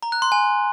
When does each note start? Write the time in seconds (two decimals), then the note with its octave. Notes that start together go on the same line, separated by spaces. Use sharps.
0.03 A#5
0.12 F#6
0.22 C6
0.32 G#5